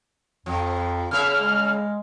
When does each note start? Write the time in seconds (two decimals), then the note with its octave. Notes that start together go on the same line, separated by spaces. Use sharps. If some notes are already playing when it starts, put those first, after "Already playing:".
0.46 F2 F3
1.11 C#3 A#3 E5 F6
1.40 G#3